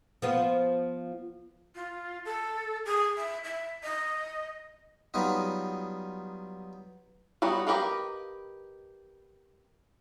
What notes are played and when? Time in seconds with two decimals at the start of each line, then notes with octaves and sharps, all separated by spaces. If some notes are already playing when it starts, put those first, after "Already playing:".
0.22 F3 B3 F4
1.75 F4
2.25 A4
2.85 G#4
3.17 E5
3.44 E5
3.83 D#5
5.14 F#3 G3 B3 D#4 F4 D#5
7.42 F#3 G3 B3 D#4
7.67 G4 A#4 B4 D#5 F5